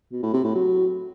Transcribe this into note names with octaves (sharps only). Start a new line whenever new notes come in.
B2
A2
C3
A2
F#3